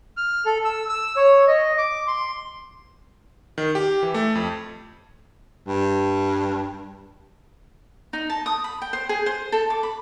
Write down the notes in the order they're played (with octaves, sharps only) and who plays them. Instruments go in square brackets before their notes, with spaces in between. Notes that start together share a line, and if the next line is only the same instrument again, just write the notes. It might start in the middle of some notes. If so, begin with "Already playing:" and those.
[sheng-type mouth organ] F6
A4
E6
E6
C#5
D#5
D6
C6
[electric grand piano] D#3
G4
E3
A3
F2
[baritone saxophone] G2
[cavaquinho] D#4
A5
D#6
B5
G5
C5
G#4
C5
A4
D6
B5